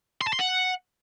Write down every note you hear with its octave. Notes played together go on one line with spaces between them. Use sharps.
C6
A5
C6
F#5